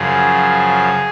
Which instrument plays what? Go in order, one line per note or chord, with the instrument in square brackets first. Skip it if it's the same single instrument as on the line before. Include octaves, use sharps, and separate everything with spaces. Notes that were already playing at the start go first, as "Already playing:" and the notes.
Already playing: [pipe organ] F#2 C#3 F3 G#4